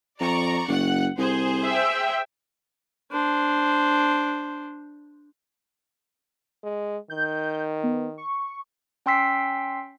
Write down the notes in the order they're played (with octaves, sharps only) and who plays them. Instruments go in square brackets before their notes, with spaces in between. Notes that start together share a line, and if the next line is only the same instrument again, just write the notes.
[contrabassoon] F2 [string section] D5 A#5 C#6
[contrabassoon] F#1 [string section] F#5
[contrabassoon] C2 [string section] G#4 C5
[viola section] E5 G5
[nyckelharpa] D4 C5
[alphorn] G#3
[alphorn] D#3 [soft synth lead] G6
[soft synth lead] B3
C#6
[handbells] C#4 G5 C6 E6 B6 C7